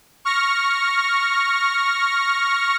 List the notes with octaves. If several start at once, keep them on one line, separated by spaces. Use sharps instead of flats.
C#6 F6 A#6